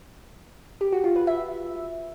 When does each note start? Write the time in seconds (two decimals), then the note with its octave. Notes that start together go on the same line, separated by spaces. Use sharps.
0.81 G4
0.92 F#4
1.04 F4
1.16 B4
1.27 E5